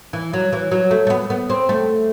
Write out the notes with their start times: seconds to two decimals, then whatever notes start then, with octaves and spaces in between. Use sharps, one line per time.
0.13 E3
0.34 F#3
0.53 E3
0.71 F#3
0.91 A3
1.07 A3
1.10 B3
1.30 B3
1.50 C4
1.69 A3